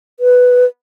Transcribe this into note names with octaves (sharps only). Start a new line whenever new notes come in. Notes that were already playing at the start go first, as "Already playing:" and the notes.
B4